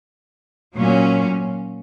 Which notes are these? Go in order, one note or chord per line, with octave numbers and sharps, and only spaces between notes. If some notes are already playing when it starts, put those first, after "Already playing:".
A#2 F#3 C#4